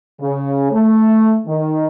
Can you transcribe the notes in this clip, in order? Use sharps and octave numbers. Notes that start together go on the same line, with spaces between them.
C#3
A3
D#3